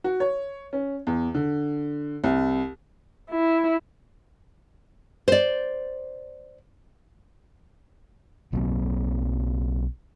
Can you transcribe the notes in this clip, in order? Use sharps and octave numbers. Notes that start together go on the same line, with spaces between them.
F#4
C#5
C#4
E2
D3
C2
E4
C5 D5
B1 F#3 A#3 C4